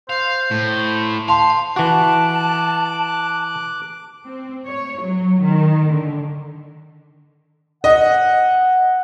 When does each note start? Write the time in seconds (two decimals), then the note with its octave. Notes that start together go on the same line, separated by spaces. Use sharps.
0.09 C5 F5
0.51 A2
1.28 F5 A5 C6
1.76 E3 F#4 A5 D6 F#6
4.26 C4
4.66 C#5
5.01 F#3
5.42 D#3
5.91 D3
7.84 D#5 F#5